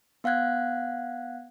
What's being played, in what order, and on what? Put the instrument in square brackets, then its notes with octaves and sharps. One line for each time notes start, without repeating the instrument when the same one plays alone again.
[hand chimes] B3 F5 F#5 F#6 G#6